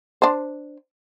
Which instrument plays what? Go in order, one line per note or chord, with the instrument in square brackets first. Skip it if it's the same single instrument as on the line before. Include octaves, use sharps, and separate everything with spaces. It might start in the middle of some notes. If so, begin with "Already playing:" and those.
[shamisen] D4 C5